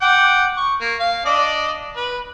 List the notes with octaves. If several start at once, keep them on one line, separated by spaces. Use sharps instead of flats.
F#5 G5 D6
C#6
A#3
F5
D4 D5 D#5
B4